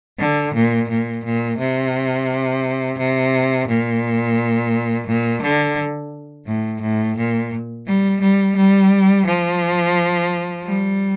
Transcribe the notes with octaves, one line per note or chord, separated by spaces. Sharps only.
D3
A#2
A#2
A#2
C3
C3
A#2
A#2
D3
A2
A2
A#2
G3
G3
G3
F3
G3